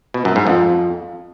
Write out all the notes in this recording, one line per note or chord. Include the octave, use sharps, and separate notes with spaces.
B2
F#2
G#2
F2